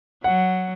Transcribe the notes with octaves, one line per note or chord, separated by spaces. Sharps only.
F#3 F#5